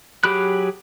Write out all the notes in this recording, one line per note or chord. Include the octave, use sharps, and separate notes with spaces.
F#3 G4 G#4 B5 F#6